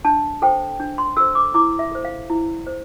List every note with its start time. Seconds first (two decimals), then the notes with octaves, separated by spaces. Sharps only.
0.05 D4 A5
0.42 A4 C5 G5
0.80 D4
0.98 C6
1.17 A4 C5 E6
1.35 D6
1.54 E4 D6
1.79 E5
1.91 A4 C5
2.05 F5
2.30 E4
2.67 C5